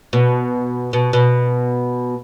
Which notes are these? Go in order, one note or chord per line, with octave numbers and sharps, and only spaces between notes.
B2
B2
B2